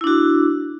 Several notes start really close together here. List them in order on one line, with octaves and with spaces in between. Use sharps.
E4 D4 F#4